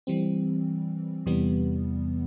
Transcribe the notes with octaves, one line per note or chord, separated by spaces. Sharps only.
E3 G3 C4
E2 C3 E3 G3 B3